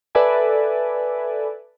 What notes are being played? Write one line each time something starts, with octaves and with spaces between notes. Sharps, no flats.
A4 B4 D5 E5 G#5